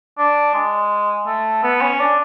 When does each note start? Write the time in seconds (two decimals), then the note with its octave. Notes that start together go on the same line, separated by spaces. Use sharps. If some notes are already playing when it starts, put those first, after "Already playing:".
0.18 D4
0.54 G#3
1.27 A3
1.64 B3
1.81 C#4
2.00 D4